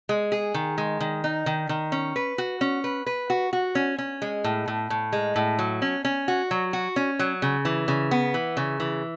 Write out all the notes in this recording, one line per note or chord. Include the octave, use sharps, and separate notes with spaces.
G#3
G#4
D#3
G#3
D#3
D#4
D#3
D#3
C#4
B4
F#4
C#4
B4
B4
F#4
F#4
C#4
C#4
G#3
A2
A2
A2
G#3
A2
F#3
C#4
C#4
F#4
F#3
F#4
C#4
F#3
C#3
E3
C#3
B3
E3
C#3
E3